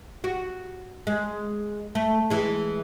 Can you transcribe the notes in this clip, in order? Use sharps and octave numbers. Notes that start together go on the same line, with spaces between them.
F#4
G#3
A3
E3 G#3